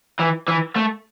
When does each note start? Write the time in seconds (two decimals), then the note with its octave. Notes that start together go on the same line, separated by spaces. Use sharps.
0.20 E3
0.48 E3
0.76 A3